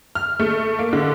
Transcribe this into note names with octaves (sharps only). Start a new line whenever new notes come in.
F6
A3
A#3
D3